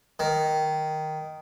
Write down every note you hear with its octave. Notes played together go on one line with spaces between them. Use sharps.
D#3